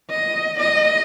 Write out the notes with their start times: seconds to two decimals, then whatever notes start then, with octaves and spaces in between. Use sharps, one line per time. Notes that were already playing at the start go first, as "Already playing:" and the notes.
0.11 D#5
0.60 D#5